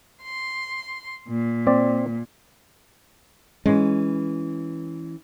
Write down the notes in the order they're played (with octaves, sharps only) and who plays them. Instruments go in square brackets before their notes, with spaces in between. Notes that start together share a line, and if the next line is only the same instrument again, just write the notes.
[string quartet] C6
A#2
[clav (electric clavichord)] C4 D5
[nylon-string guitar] E3 C#4 [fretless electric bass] G#3